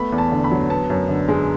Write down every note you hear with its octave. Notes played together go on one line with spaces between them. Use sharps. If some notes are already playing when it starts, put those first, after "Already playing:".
Already playing: A3 B3 B5
E2
A5
D3
B5
F#3
B3 A5
F#2
D3
G#3